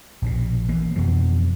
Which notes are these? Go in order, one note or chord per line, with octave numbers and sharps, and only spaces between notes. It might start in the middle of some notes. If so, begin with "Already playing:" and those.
A#1 B2
E3 A#3
F2 B2 E3 F3